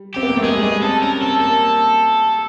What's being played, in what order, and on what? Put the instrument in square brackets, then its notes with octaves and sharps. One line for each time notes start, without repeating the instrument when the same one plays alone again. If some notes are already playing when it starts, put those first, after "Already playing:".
Already playing: [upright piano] G3
[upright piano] C4 [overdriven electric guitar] G4
[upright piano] B3
A#3
A3
[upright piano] G#3 [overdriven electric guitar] G#4
[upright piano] G3
[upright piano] G#3 [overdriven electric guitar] G#4
[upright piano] C4 [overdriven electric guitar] A4
[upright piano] C#4 [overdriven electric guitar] A#4
[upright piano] C4 [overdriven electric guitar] A4
[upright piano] A#3 [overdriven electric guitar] A4